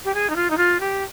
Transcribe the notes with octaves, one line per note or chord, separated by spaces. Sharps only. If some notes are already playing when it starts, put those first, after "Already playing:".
G4
G#4
D#4
F4
D#4
F4
G4